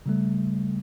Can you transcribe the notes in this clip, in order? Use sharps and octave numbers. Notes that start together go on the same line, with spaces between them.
C#3 G3 A3